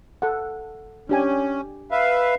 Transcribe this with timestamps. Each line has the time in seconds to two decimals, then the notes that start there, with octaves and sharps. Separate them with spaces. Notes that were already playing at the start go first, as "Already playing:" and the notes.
0.22 A4 F#5
1.09 C#4 D4 G4 G#5
1.91 B4 E5 F5